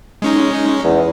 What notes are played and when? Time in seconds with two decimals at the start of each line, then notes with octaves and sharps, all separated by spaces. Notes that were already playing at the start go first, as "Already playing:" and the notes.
0.22 G#3 C#4 D#4
0.84 E2